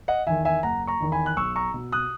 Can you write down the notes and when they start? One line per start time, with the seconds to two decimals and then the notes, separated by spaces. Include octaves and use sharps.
0.08 D#5 F#5
0.27 E2 D#3 E5 G#5
0.45 E5 G#5
0.63 F#1 F#5 A#5
0.87 A#5 C#6
1.00 E2 D#3
1.12 G#5 B5
1.26 F#6
1.37 B1 C#6 E6
1.56 A#5 C#6
1.74 B2
1.92 D#6 F#6